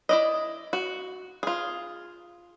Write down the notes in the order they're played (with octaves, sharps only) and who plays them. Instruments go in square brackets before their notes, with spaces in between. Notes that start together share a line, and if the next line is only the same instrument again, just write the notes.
[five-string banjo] E4 D5 D#5
F#4
F4 G#4